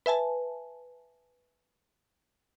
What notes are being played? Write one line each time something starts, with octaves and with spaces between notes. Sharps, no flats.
B4 E5 G#5 A5